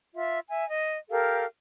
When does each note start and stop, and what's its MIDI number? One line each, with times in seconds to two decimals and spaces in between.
0.13 0.39 65
0.13 0.39 76
0.48 0.65 76
0.48 0.65 80
0.68 0.99 75
1.10 1.44 67
1.10 1.44 69
1.10 1.44 70
1.10 1.44 77